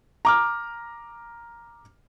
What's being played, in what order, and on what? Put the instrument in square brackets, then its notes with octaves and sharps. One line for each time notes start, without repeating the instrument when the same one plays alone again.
[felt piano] A#5 D6 F6